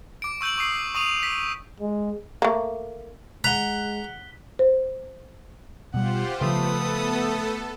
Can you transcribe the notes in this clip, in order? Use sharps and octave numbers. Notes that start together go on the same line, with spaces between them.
D6 D7
C#6 E6 G6 D7 F#7
C#6 D#6 C7 F#7
C#6 D#6 D#7 F7
B6
G#3
A3 A#3
G#3 F#5 A#5 F#6 B6 G7
C5
B2 G3 F4 G4 C5 F#5
C#3 F3 A3 B3 A4 B4 D#6